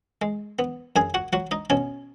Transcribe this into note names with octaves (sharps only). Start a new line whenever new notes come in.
G#3
B3
F#2 G#4 G#5
F#4 F#5
F#3 F#4 F#5
D#4 D#5
B2 C#4 C#5